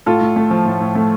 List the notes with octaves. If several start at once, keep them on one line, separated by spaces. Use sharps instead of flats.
A2 F4 A4
A2
A3
F3
A2
A2
A3